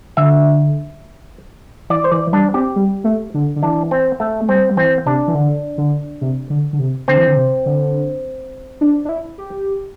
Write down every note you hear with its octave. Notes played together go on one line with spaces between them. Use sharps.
D3 E5
E3 D5
C5
E3 D5
E3
G3 D4
C4 G4
G3
A3
D3
D3
E3 D4
C4
A3
A3
G3 C4
G3
E3 C4
C3 D4
E3
D3
D3
C3
D3
D3
C3
D3 C4
E3
D3
C3
D3
D4
D4
E4
G4